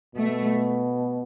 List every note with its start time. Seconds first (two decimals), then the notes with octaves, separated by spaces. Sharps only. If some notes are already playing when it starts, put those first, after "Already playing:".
0.15 B2 A3